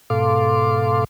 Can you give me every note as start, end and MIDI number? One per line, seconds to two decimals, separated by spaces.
0.10 1.04 44
0.10 1.04 47
0.10 1.04 69
0.10 1.04 77
0.10 1.04 84
0.10 1.04 86